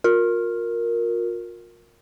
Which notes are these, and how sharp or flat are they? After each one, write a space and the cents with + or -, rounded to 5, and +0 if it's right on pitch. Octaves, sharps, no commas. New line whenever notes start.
F4 +40 A#4 +0